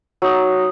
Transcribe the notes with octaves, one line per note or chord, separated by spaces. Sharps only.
F#3 D#4